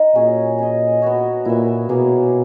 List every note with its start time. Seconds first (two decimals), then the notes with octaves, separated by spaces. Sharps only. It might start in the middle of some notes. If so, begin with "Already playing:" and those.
Already playing: D#4 D#5
0.15 A#2 F#3 C#4 G#4 C#5
0.58 C#4 G#4 D#5
1.02 B3 F#4 C#5
1.45 A#2 E4 B4 E5
1.89 B2 F#3 A#3 E4 G#4